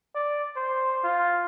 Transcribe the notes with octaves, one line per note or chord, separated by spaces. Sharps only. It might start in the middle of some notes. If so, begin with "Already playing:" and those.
D5
C5
F4